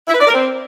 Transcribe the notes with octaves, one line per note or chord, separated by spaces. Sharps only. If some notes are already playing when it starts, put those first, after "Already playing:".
E4
B4
D5
A#4
C4